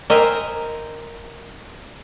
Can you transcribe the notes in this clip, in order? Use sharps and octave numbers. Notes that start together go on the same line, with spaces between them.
A#4 C5 D#5 E5 G5 G#5